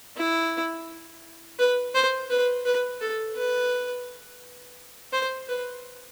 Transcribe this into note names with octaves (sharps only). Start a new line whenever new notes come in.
E4
B4
C5
B4
B4
A4
B4
C5
B4